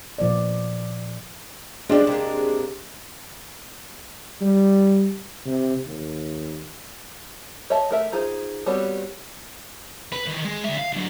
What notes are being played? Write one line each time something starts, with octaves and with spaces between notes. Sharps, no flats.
A#2 F3 B3 D5
F3 G3 G#3 D4
C3 A#3
G3
C3
D#2
C#5 D#5 E5 A5
A3 A#4 E5
D#4 F4 G#4 C5
G3 B3 C4 F#4 C#5
B4
D#3 E3
G#3
D2 E5
F5
D3 F#3